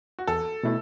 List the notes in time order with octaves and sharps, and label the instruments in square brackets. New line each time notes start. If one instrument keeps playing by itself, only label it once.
[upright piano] F#4
[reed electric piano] E2 [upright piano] A4
[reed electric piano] B2 A3 E4